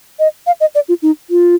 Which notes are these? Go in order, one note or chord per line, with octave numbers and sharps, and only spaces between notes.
D#5
F5
D#5
D5
F4
D#4
F4